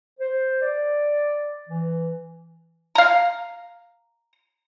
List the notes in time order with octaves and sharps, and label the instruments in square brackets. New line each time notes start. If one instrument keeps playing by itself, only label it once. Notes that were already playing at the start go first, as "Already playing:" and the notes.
[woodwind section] C5
D5
E3
[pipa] F5 A#5